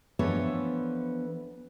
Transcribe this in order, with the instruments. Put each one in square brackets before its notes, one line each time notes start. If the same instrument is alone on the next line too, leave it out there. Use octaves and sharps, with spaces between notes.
[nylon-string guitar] E3 F3 B3 D4 A4 C#5